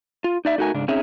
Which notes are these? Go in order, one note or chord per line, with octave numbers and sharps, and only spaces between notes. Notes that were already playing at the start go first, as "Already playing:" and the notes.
F4
D#4 D5 E5
A3 D#4 F#4 A#4 G#5
G#2 C#3 D4
C4 C#4 D#4 G#4 C#5 E5